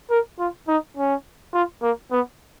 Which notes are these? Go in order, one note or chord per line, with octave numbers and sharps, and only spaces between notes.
A#4
F4
D#4
C#4
F4
A#3
B3